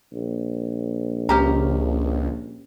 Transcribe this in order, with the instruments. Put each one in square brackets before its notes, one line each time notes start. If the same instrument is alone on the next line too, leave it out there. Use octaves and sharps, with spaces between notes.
[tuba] A#1
[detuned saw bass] C#2 [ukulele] C#4 G4 A#5